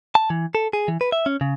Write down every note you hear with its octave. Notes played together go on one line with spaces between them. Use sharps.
A5
E3
A4
G#4
E3
B4
E5
C#4
C#3